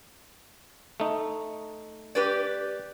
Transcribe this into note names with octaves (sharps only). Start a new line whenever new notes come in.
A3 D#4
G4 B4 D5